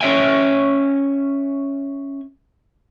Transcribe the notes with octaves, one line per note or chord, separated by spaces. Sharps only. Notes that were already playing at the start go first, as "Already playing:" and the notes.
C#4 C#5 D#5 E5 G5 G#5